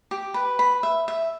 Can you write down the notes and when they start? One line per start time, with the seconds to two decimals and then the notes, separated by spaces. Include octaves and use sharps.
0.11 G4
0.34 B4
0.59 B5
0.83 E5
1.08 E5